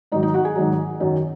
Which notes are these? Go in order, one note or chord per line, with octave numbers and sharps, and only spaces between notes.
G#2 D#3 F#3 D#4 D#5
D#4 D#5
F#4 F#5
G#4 G#5
G#2 D#3 F#3
F#2 D#3 F#3